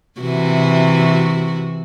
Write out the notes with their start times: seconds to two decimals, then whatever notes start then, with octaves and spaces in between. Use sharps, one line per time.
0.20 C3 E3 F#4